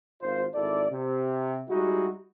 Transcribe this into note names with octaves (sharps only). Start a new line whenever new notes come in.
G#1 F4 C5
G#1 E4 A4 D5
C3
G3 G#3 D#4 E4 F#4